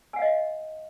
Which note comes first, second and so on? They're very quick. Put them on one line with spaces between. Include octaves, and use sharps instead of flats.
G#5 F#5 F5 D#5